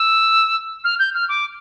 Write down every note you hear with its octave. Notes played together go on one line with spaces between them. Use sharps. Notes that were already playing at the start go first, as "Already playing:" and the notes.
Already playing: E6
F6
G6
F6
D6